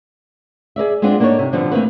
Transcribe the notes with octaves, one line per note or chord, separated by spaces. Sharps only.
G#4 A#4 D5 E5
G#3 B3 C4 D4 F4
A#3 D4 D#4 A4 C#5
C3
B2 D3 F3 G3 C4 D4
D#3 F3 A3 A#3 C4 B4